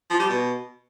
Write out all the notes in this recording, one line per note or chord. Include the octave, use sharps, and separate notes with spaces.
F3
G3
B2